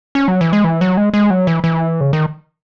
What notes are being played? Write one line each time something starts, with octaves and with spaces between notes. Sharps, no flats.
C#4
F#3
E3
G#3
E3
F#3
G#3
G#3
F#3
E3
E3
C#3
D#3